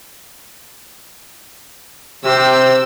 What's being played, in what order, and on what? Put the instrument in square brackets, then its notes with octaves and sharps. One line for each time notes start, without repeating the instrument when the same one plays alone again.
[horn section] C3 C5 [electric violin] G4 E6